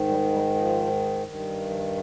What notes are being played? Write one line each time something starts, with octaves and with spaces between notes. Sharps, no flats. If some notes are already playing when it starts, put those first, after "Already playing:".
Already playing: G#2 D#3
G3
G3
F3
G2 D#3
F3